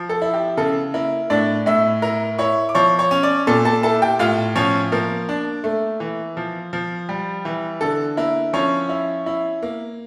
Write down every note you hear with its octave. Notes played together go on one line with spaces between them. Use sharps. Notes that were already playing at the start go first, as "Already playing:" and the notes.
Already playing: F3
A4
E4
G4
C#3 A4
A#3 E4 A#4
A2 D4 D5
A2 E4 E5
E4 A#4 A#5
E4 C#5 C#6
D6
F3 C#5 C#6
C#5 C#6
C#4
D5 D6
A#2 A4 A5
A4 A5
E4 A4 A5
G4 G5
A2 F4 F5
F3 C#4 C#5
F3 A#3 A#4
D4
A3
E3
F3
F3
G3
E3
D3 A4
A#3 E4 A#4
F3 C#4 C#5
E4
E4
A#3